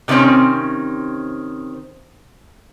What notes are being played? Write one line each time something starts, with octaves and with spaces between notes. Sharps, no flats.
C3 D#3 E3 C4 C#4